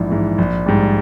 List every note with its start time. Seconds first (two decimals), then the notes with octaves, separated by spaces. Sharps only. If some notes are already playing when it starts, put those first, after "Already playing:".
Already playing: A#1 G#2 E3
0.10 G#2 E3
0.38 A#1
0.66 G#2 G3